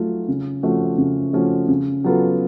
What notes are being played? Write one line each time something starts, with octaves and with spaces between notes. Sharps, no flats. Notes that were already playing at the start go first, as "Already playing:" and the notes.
Already playing: F#3 A3 F4
C#3
F3 A3 C#4 F#4
C#3
F3 A3 C#4 F#4
C#3
F#3 B3 F4 A4